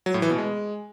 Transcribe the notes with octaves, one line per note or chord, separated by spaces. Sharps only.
F#3
A2
E3
B2
G#3